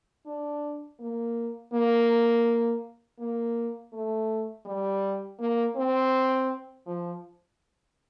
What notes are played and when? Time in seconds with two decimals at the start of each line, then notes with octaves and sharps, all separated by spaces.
0.26 D4
1.00 A#3
1.73 A#3
3.19 A#3
3.93 A3
4.65 G3
5.40 A#3
5.76 C4
6.86 F3